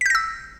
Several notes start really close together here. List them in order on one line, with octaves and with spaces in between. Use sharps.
B6 G6 A#6 E6